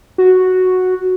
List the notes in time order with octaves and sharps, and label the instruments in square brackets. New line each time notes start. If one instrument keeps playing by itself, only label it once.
[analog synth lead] F#4